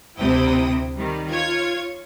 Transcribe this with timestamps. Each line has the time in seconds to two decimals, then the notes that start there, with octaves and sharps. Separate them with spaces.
0.18 D2 C3 E4 G5 D#6
0.95 D#3 G3
1.30 F4 C#5 G#6